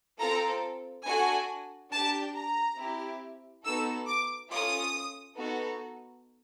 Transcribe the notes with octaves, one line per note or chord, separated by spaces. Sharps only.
C4 F4 A4 A#5
D4 F#4 A4 G#5
D4 G4 A5
A#5
C4 E4 G4
B3 D#4 F#4 A4 E6
D6
C#4 F4 A4 D#6
B3 D#4 F#4 A4